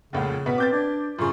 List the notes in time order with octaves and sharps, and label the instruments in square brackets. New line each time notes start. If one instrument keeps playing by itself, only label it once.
[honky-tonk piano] F1 C#2 A#2 [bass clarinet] C#3 [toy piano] C#4 C#5 F#5
[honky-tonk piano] B2 B3 B6 [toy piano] B4
[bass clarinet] C4 [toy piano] B4 C5 [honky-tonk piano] D6 G6 A6
[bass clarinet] D4 [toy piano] D5
[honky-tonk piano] F#2 C#3 [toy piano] D4 C#6 [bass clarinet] F4